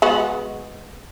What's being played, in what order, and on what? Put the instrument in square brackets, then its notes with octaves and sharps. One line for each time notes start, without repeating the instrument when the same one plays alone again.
[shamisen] G#3 B3 F#4